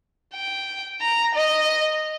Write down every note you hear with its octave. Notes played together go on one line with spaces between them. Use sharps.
G5
A#5
D#5